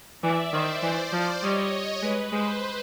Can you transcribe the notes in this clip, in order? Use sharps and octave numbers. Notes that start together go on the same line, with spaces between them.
E3 D5 E5
D#3 C5
E3 C5 D5
F3 C5 D5
G3 C#5 D#5
G#3 B4
G#3 C5